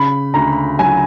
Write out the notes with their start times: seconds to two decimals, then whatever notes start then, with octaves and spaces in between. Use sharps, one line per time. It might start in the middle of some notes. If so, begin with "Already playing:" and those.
Already playing: C#3 B5
0.34 D2 A#5
0.79 F#3 G#5